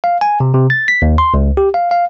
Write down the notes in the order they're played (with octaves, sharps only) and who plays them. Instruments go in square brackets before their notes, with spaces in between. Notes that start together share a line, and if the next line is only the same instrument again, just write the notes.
[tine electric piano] F5
G#5
C3
C3
A6
B6
D#2
C6
C#2
G4
F5
F5